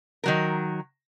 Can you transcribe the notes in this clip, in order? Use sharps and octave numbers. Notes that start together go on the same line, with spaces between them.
D#3 F#3 A#4